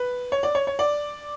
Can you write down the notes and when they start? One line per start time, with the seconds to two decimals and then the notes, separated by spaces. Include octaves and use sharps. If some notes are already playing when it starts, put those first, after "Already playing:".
Already playing: B4
0.32 C#5
0.43 D5
0.55 C#5
0.67 C#5
0.79 D5